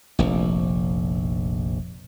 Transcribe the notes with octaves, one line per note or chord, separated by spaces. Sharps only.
F1 A#1